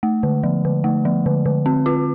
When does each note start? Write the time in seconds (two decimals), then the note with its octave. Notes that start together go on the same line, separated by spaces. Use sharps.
0.03 A3
0.23 D3
0.44 F3
0.65 D3
0.84 A3
1.05 F3
1.26 D3
1.46 D3
1.66 C4
1.86 F4